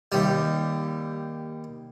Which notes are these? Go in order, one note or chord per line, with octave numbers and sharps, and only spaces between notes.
D#2 G3